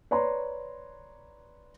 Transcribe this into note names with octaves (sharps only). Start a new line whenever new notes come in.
B4 C#5 D5 A#5 C6